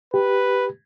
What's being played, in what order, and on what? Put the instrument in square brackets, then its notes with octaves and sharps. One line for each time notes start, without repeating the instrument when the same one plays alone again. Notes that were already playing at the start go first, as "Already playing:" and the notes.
[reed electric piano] G4 [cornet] B4